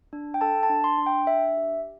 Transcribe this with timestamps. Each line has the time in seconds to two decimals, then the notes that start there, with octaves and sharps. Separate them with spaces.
0.13 D4
0.34 G5
0.41 A4 A5
0.63 A5
0.70 D4
0.84 C6
0.98 D4
1.06 G5
1.27 D4 E5
1.57 G4